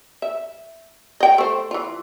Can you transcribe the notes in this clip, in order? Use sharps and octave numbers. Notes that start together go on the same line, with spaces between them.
E5
D#5 G5
A3 C5
E3 F4